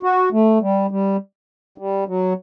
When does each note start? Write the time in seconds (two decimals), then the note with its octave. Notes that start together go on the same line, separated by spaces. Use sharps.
0.03 F#4
0.32 A3
0.61 G3
0.90 G3
1.78 G3
2.07 F#3